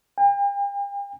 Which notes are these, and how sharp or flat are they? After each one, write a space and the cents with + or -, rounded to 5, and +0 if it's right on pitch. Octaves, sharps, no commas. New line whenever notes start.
G5 +40